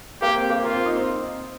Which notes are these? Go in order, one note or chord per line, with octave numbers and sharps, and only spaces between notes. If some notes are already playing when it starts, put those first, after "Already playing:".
A#3 G4
C4
A#3
A#3 F4
C4
D#4
C4